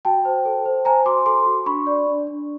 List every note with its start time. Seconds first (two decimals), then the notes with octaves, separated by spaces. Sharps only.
0.05 F#4 G5 A5
0.25 C5
0.45 A4
0.66 C5
0.85 C5 G#5 A#5
1.06 F#4 C6 D6
1.26 A4 C6 D6
1.46 F#4
1.66 D4 B5 C#6
1.87 D5
2.07 D4
2.27 D4